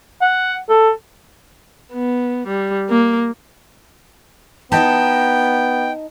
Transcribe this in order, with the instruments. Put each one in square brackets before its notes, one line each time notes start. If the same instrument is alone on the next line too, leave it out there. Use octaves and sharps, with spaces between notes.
[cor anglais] F#5
A4
[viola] B3
G3
A#3
[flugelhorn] B3 [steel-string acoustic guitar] D#4 D#5 A5 [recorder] G5